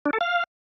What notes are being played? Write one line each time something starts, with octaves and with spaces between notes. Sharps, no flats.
D4
A4
F5